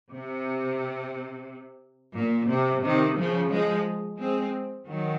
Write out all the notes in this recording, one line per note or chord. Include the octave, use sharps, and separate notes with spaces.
C3
A#2
C3
C3 D#3
C#3 F3
F3 G#3
G#3 C4
D#3 F#3